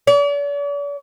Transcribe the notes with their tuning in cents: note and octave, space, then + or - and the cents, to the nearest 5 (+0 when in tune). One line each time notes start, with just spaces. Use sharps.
D5 -45